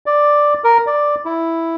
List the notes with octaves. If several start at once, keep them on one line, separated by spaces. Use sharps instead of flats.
D5
A#4
D5
E4